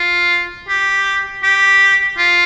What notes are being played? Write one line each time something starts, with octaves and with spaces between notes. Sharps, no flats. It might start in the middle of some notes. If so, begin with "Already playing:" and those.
Already playing: F4
G4
G4
F4